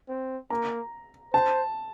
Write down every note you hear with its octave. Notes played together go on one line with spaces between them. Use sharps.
C4
A#3 A#5
C5 A5